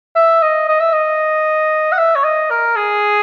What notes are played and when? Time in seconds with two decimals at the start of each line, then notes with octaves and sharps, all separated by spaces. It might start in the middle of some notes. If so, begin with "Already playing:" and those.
0.16 E5
0.42 D#5
0.68 D#5
0.80 E5
0.93 D#5
1.92 F#5
1.98 E5
2.15 C#5
2.24 D#5
2.51 A#4
2.76 G#4